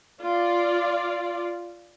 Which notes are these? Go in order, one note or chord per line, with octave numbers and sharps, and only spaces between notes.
F4 D5